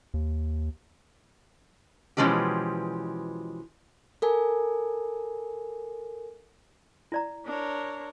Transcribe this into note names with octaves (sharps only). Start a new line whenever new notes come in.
D#2
B2 E3 F3 G#3 C#4 G4
A4 A#4 G#5
E4 D5 A#5
D4 A#4 C#5